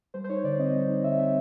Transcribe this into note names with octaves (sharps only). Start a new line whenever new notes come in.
G3 C5
C5
D#4 C#5
D3 D5
C4 D#5
G3
D#4
D3 E5
C4 E5